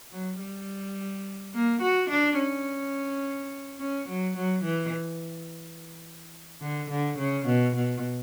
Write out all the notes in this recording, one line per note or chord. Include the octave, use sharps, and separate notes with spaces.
F#3
G3
A#3
F#4
D4
C#4
C#4
F#3
F#3
E3
D3
D3
C#3
B2
B2